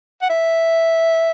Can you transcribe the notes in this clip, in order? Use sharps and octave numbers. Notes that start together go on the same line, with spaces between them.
F#5
E5